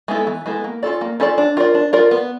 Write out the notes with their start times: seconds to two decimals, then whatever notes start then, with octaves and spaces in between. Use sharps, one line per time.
0.08 G#3 B3 E4 A4
0.27 E3
0.46 G#3 B3 E4 A4
0.64 A#3
0.83 C#4 F4 A4 D5
1.01 A#3
1.20 C#4 F4 A4 D5
1.38 D4
1.57 F4 A#4 D5
1.74 D4
1.93 F4 A#4 D5
2.11 B3